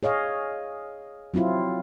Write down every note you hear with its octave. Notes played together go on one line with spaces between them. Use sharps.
G#4 C#5 D#5 F5
F#3 C4 E4 F4